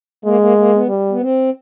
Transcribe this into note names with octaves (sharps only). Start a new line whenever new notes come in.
G#3 A#3
A#3
A#3
B3
G3
B3
C4